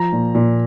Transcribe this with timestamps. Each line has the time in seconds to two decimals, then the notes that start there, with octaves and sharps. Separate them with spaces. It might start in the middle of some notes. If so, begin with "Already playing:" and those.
Already playing: F3 A#5
0.13 A#2
0.35 A#2